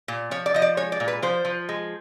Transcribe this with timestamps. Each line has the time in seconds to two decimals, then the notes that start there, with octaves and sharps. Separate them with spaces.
0.08 A#2
0.31 F3 C#5
0.46 D5
0.54 F3 D#5
0.62 D5
0.77 G#3 C#5
0.92 D5
1.00 A#2
1.08 B4
1.22 F3 C5
1.45 F3
1.69 G#3